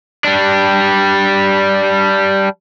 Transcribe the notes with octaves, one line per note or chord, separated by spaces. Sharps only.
G3 D4